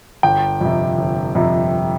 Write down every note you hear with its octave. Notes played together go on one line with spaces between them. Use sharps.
G1 G5
F2 C3
G1
F2 C3